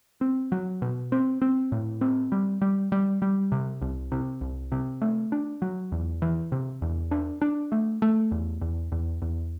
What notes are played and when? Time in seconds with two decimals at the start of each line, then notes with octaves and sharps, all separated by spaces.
0.21 C4
0.52 F#3
0.82 B2
1.12 C4
1.42 C4
1.72 A2
2.01 C4
2.32 G3
2.62 G3
2.92 G3
3.22 G3
3.52 C3
3.82 C2
4.12 C3
4.41 C2
4.72 C3
5.02 A3
5.32 D4
5.62 F#3
5.92 E2
6.22 E3
6.52 C3
6.82 E2
7.11 D4
7.42 D4
7.72 A3
8.02 A3
8.32 E2
8.61 E2
8.92 E2
9.22 E2